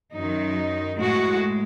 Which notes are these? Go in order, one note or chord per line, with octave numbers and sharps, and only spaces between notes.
F#2 D#3 F#3 D#4
A2 G#3 F#4